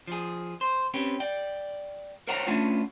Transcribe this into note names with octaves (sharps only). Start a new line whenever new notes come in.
F3 G#4
C5
C4 C#4 G4 B4
D5 G5
A#4 C5 C#5 F#5 G5 A#5
A3 B3 C#4 D4 F4